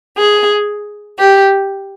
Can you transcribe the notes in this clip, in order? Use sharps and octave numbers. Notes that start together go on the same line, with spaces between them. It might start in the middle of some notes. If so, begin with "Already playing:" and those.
G#4
G4